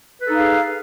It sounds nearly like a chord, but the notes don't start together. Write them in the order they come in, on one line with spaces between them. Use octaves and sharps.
B4 A4 D#4 F5 G#4